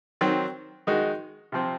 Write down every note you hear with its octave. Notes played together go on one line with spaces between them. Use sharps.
D#3 F#3 C4
D#3 G#3 D#4 F#4
C3 F3 C4